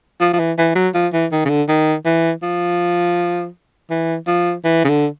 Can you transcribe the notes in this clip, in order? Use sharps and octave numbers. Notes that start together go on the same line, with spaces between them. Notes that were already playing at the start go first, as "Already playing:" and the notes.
F3
F3
E3
E3
F#3
F3
E3
D#3
C#3
D3
D#3
E3
F3
E3
F3
E3
C#3
D3